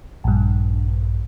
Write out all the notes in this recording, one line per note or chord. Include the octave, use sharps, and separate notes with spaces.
A#1 G2